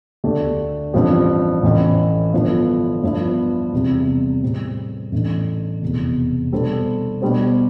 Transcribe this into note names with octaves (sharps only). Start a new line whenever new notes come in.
D2 D3 A3 D4 G4
A1 G2 F3 C4 G4
A1 A2 E3
G2 D3 F3 B3 E4
G2 F3 B3 E4
E2 C3 G3
A2 G3 C4
A1 A2 E3 A3 D4
F1 E2 B2
B2 G3 D4 A4 C5
B2 G3 D4 G4 C5